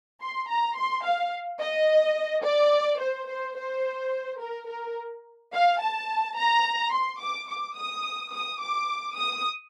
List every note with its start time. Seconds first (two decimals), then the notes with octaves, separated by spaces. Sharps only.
0.20 C6
0.49 A#5
0.76 C6
1.05 F5
1.60 D#5
2.44 D5
3.00 C5
3.29 C5
3.57 C5
4.40 A#4
4.69 A#4
5.53 F5
5.81 A5
6.37 A#5
6.93 C6
7.20 D6
7.49 D6
7.76 D#6
8.32 D#6
8.61 D6
9.16 D#6